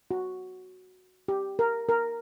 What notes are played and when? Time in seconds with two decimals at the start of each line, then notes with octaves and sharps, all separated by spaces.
0.11 F#4
1.28 G4
1.59 A#4
1.89 A#4